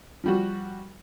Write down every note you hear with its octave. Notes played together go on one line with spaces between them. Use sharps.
F3 G3 F#4